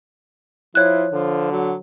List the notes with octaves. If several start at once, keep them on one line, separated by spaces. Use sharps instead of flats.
F3 E4 C#5 F#6
D3 F3
F#3